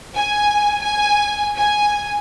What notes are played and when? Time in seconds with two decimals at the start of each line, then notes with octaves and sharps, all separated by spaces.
0.14 G#5
0.81 G#5
1.58 G#5